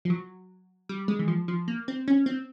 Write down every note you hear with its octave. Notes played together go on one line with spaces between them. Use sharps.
F3
F#3
G3
G#3
E3
F3
F3
A#3
C4
C#4
C4